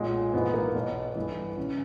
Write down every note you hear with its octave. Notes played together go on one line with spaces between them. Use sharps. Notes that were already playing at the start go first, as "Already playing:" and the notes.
Already playing: B1 A#2 G#3
A#1 G#2 E3 B3
A#3
B1 B2 B3
G1 G2 E3
C#3 E3 C#4